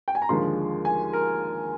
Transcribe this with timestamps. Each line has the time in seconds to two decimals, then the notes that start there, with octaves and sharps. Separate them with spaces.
0.08 G5
0.15 G#5
0.22 A#5
0.29 D#2 D3 F3 G#3 C6
0.85 G#5
1.13 A#4